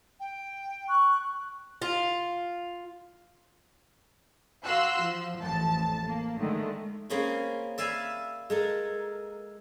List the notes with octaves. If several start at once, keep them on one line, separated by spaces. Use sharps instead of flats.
G5
C#6 F#6
F4
F#4 F5 C6 E6 F#6
F3
A1 F2 A5
A#3
D3 D#3 G#3 A3
A#3 C4 C#4 G#4 B5
D5 E5 F5 G#5 B5
G#3 A4 A#4